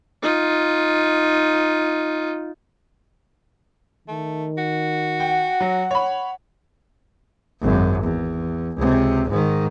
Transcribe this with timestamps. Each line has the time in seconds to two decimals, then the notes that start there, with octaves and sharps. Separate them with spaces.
0.22 D#4 F4
4.08 D#3 A3
4.58 F#4
5.20 F#5 G5
5.61 F#3
5.91 C#5 B5
7.62 G#1 F#2
8.03 E2
8.76 C#2 C3
9.29 G#2 D#3